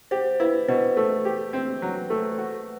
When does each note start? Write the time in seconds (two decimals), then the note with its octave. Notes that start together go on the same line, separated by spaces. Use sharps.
0.11 G4 C5
0.40 E4 B4
0.68 B2 C5
0.97 A3
1.25 G4
1.53 C4
1.82 F#3
2.10 A3
2.38 F#4